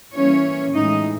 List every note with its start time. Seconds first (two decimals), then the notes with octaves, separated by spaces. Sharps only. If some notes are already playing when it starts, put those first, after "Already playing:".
0.15 E3 G3 A#3 C#4 C#5
0.73 A2 E3 G#3 D#4 D#5